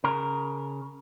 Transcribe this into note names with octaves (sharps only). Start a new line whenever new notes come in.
C#3 A#4